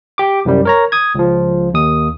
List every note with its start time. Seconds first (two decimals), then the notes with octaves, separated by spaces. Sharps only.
0.18 G4 D6
0.45 C2 F#2 G3
0.65 A#4 C#5 A#5
0.92 D#6 G#6
1.15 C#2 F3
1.74 D#2 D#6